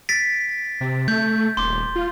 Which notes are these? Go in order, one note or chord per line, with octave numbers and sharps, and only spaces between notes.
A6 B6 D7
C3
A3 G6
D#1 C6 D6
F4